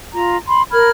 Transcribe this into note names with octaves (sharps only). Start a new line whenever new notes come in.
F4 A#5
B5 C6
A#4 B5 F6 G#6